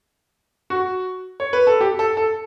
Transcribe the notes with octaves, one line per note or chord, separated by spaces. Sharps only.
F#4
C#5
B4
A4
G4
A4
A4